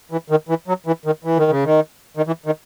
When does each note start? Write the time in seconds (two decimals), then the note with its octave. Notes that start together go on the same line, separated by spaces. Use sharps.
0.11 E3
0.30 D#3
0.49 E3
0.68 F#3
0.86 E3
1.06 D#3
1.24 E3
1.37 D#3
1.50 C#3
1.64 D#3
2.17 D#3
2.27 E3
2.46 D#3